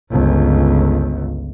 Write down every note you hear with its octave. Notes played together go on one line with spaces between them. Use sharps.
G1 C#2